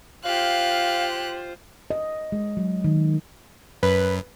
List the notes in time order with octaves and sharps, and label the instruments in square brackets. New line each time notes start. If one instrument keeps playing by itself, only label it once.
[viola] F4 C5 [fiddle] G4 F#6 [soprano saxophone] F5
[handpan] D#5
G#3
F#3
D#3
[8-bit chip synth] F#2 [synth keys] B4